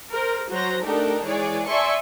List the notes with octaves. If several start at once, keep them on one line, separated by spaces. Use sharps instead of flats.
A#4 C5
F#3 F#4 C5 A#5 A#6
A3 D4 D#4 G4 A4 A#4
E3 G#3 G#4 C#5 D5
D5 E5 G#5 A5 C6 C#6